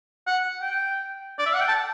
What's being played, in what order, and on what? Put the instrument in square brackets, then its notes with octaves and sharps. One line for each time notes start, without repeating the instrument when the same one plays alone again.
[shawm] F#5
G5
D5
E5
F#5
G5
A5